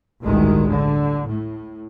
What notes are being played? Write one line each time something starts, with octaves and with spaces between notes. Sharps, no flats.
A1 D2 G2 D#3 G#3
D3
A2